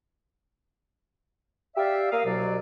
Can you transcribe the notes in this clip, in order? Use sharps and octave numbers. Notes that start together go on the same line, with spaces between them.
G4 D5 E5 F5
A#3 A#4 F5 D#6
C2 B2 F#3 D5